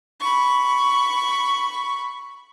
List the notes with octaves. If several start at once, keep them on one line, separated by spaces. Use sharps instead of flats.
B5 C#6